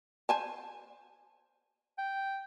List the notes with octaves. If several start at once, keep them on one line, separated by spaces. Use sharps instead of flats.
C5 G#5 A5
G5